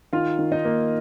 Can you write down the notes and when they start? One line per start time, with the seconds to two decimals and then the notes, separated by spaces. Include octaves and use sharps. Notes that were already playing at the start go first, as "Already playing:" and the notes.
0.13 D#3 F4 F5
0.39 D#3
0.52 D#4 D#5
0.65 A#3